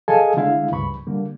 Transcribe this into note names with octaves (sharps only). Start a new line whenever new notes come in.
G#4 A4 D#5 F5 G#5 A5
D3 G#3 E4 E5 F5
C#2 G2 B5 C#6
D3 G3 A#3